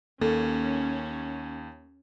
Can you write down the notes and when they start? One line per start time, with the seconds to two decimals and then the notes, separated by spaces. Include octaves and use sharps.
0.21 D#2 A#3 C#4 A4